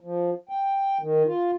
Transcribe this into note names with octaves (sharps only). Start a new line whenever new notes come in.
F3
G5
D#3
F4